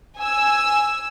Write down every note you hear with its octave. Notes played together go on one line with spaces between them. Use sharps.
G#5 E6